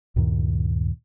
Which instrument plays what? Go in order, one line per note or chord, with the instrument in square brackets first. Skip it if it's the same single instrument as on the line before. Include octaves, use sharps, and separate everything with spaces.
[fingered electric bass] D2 G2 A#2 D#3